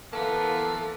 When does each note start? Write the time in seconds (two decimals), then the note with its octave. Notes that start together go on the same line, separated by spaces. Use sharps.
0.13 E3 A#3 B3 A4 F5 A5